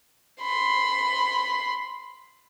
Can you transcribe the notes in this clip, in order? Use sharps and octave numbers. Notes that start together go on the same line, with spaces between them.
B5 C6